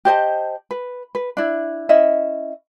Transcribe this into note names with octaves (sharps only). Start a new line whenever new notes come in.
G4 C5 D#5 A5
B4
B4
D4 E4
C#4 E4 D#5 E5